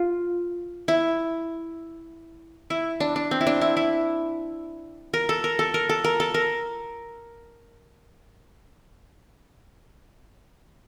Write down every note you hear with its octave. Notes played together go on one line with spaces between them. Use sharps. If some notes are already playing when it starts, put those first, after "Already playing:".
Already playing: F4
E4
E4
D4
D4
C4
E4
D4
E4
E4
A#4
A4
A#4
A4
A#4
A4
A#4
A4
A#4